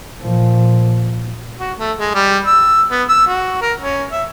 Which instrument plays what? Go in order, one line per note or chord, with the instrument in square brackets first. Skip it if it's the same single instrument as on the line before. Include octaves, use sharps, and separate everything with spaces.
[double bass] A#2 F3
[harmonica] F#4
A3
G#3
G3
E6
B3
E6
F#4
A#4
C#4
E5